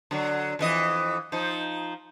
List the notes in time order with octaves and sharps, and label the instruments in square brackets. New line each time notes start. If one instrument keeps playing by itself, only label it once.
[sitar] D3 F#3
F2 E3 D#5
F3 D#4